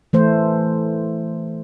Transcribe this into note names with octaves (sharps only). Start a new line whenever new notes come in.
E3 A3 C5